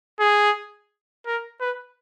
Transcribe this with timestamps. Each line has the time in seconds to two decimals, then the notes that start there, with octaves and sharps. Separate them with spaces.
0.20 G#4
1.26 A#4
1.61 B4